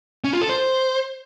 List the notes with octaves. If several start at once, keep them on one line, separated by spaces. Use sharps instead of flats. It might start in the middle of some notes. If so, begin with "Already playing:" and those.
C#4
F4
A4
C5